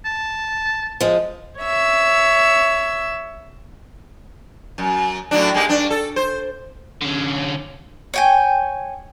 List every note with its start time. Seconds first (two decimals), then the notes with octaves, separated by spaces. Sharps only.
0.05 A5
1.01 F3 G#3
1.59 C#5 E5 E6
4.78 F#2
5.31 A2 F#3 D4
5.54 G#3 A#3 G4
5.69 G2 D4
5.90 A4
6.16 C5
7.02 D3 C#4
8.14 C#5 G5 G#5